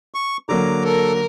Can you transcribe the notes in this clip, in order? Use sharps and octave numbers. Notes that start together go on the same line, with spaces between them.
C#6
D3 F#3 A#3 A#5 D6
A4 A#4